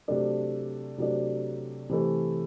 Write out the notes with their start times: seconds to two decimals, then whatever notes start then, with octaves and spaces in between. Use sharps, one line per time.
0.08 C3 F#3 A3 D4
0.98 C3 F#3 A3 D4
1.90 C3 E3 A3